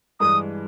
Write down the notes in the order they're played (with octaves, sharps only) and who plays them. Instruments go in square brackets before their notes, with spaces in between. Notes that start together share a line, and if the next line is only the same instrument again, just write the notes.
[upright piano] G2 E3 G#3 [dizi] D#6